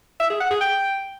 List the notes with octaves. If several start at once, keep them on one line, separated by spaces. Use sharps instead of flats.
E5
G#4
F#5
G#4
G5